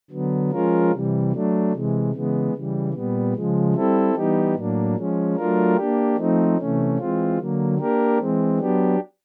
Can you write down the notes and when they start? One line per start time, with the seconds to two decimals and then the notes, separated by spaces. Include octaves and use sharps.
0.11 D3 F#3 B3
0.51 F3 G#3 C#4 F4 A#4
0.92 C3 E3 G3
1.32 F#3 A3 D4
1.72 C3 E3 G#3
2.13 C#3 E3 G#3 B3
2.53 C#3 E3 G3
2.94 A#2 G3 B3
3.34 C#3 F3 G#3
3.74 G3 C4 E4 A4
4.14 E3 G3 B3 D#4 G4
4.55 A2 F#3 A#3 D4
4.95 F3 G#3 C#4
5.36 F#3 A3 D4 F4 A#4
5.76 A#3 D4 G4
6.17 F3 A3 C4 D#4
6.58 C3 E3 A3 C#4
6.98 E3 G#3 C4 F4
7.38 D3 F#3 A#3
7.79 A#3 D4 G4 A#4
8.19 E3 G#3 C4
8.59 F#3 B3 D4 G4